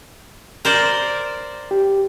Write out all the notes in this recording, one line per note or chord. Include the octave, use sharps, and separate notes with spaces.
A#4 C5 D5
G4